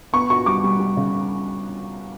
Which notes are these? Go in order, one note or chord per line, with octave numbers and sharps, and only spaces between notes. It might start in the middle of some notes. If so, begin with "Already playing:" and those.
B3 C#6
F#4 C#6
G3 D6
G3
G3
C#3